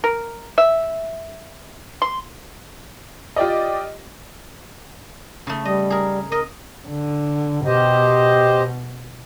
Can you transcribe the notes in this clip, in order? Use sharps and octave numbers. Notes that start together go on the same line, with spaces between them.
A#4
E5
C6
F4 G4 D5 D#5
C#3 A3
G3 D#5
G#4 A#4
A#4 D#5
D3
B2 G4 C5 D#5